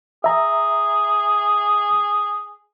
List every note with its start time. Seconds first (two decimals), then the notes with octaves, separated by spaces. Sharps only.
0.24 G#4 E5 A#5